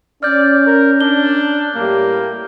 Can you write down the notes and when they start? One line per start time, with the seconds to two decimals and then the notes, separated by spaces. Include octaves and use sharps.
0.23 C#4 D5 F6 G6
0.67 A#4
1.01 D4 G7
1.75 A2 G3 A#3 G4